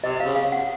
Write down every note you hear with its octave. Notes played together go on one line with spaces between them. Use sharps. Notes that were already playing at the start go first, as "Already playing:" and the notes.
C3 D#5
F5
C#3
F5
F#5